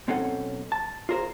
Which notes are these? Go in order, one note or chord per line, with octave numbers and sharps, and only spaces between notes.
B1 C4 C#4 D#4 A4 F#5
A5
F4 G#4 A#4 C5